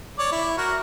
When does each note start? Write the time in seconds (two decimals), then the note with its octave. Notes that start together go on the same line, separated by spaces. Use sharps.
0.18 C#5 D5
0.32 E4
0.57 F#4 A#4